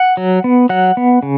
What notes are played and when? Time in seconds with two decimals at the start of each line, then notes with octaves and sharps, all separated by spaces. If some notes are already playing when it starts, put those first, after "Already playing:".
Already playing: F#5
0.17 F#3
0.44 B3
0.69 F#3 F#5
0.97 B3
1.23 C#3